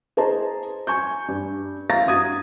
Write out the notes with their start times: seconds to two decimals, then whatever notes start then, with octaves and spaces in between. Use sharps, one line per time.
0.17 G#4 C5 D#5 A5 A#5
0.87 G#5 C#6 G6
1.28 G2
1.90 E5 F5 A#5 A6 A#6
2.06 G2 F#4 D#6 G#6 D#7